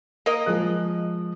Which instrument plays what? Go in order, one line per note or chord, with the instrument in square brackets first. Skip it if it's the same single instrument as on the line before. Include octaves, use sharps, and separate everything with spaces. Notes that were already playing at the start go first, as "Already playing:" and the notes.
[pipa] A#3 A#4 D#5
[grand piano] F3 G#3 F#6